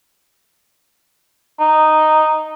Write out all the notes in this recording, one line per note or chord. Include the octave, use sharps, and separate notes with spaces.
D#4